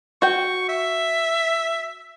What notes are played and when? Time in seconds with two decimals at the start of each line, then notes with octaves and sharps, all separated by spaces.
0.22 F#4 G5 C#6
0.69 E5